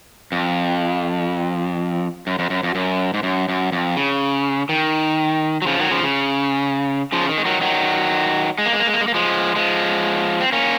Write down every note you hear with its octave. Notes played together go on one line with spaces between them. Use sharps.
F2
F#2
F2
F#2
F2
F#2
G#2
F#2
F#2
F2
C#3
D#3
F#3
C#3 F3
D#3 F#3
C#3 F3
C#3
C#3 F3
D#3
G#3
D#3 F#3
D#3 F#3
G#3
A#3
G#3
A#3
G#3
A#3
G#3
A#3
F3 G#3
F3 G#3
C4
A#3 C#4